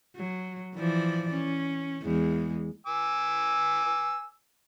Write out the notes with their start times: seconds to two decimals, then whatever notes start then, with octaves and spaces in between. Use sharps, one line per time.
0.16 F#3
0.76 E3 F3 D5
1.34 C#4
2.03 E2 G#3
2.87 G#5 D6 E6